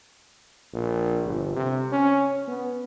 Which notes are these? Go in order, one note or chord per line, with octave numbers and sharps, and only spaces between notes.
A#1
G1
C3
C#4
B3